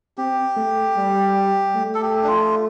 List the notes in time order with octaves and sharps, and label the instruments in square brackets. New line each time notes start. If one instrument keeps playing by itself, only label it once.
[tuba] C4 [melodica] G4
[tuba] A3
G3
A3
[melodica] A4
G4
D4
F4